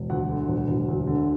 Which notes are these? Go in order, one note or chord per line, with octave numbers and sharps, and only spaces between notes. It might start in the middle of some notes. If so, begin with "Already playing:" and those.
Already playing: E1
D2 F#5
D3
E1
E1
D2
D3